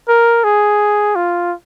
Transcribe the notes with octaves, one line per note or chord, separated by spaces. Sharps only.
A#4
G#4
F4